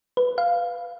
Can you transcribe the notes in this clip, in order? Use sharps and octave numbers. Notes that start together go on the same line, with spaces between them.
B4
F5